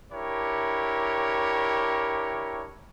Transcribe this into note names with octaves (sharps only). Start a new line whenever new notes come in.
D4 E4 G4 A#4 C#5